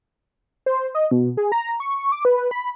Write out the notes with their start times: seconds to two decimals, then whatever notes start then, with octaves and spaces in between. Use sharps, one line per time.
0.66 C5
0.95 D#5
1.11 B2
1.37 G#4
1.52 A#5
1.80 C#6
2.12 D6
2.25 B4
2.37 B4
2.51 B5